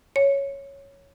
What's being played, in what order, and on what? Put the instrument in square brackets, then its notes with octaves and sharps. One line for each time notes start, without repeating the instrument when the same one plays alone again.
[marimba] C#5